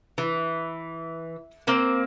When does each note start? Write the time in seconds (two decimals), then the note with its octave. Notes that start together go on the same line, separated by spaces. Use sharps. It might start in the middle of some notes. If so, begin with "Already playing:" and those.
0.18 E3
1.67 A#3 C4